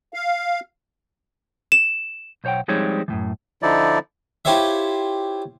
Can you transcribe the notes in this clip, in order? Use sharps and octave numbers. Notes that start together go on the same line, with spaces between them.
F5
E7
B1 C5 C#5 F#5 G5
F3 G3 G#3 C4 D#4 C#5
F#2 A2 E3
D3 F3 D#4 E4 D5
E4 F4 G4 C5 C#5 E5